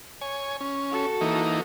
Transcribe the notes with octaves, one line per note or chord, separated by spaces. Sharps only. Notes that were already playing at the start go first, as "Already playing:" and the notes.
C#5 G#5
C#4
F#4 A4
E3 A#3 D#4